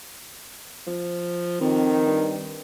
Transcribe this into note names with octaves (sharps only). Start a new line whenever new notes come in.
F3
F2 D#3
G2